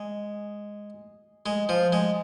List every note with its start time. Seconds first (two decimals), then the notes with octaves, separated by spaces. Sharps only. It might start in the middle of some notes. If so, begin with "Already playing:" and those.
Already playing: G#3
1.46 G#3
1.69 F3
1.93 G#3